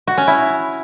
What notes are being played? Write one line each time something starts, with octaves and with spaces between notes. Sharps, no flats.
F#4
C#4
E4